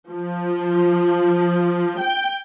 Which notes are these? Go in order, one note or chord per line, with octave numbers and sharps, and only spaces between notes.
F3
G5